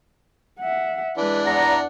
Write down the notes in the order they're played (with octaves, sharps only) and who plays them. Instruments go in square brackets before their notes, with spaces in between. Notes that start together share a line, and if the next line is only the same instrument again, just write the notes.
[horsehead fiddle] E5 F#5
[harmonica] E3 D4 [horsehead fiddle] G#3 B4
[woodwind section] E2 A#5 [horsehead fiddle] F#5